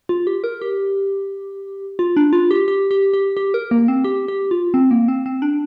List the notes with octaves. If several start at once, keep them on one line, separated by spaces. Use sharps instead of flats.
F4
G4
A#4
G4
F4
D4
F4
G4
G4
G4
G4
G4
A#4
A#3
C4
G4
G4
F4
C4
A#3
C4
C4
D4